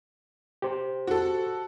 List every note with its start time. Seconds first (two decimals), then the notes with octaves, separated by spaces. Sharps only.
0.62 G4 C5
1.07 F#4 A4